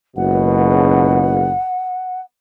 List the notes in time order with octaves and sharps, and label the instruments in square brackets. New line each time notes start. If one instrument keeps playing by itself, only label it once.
[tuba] F#1 [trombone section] C#2 F#2 B2 [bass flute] F#5